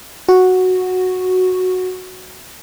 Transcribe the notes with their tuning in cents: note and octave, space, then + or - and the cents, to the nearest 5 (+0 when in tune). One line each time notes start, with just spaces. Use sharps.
F#4 -5